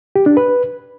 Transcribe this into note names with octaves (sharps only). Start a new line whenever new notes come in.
G4
D4
B4